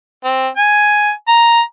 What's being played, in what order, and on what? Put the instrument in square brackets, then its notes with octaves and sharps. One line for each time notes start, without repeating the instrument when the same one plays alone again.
[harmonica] C4
G#5
A#5